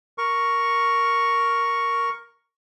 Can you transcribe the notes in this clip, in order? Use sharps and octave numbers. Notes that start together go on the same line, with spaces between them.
A#4 C#6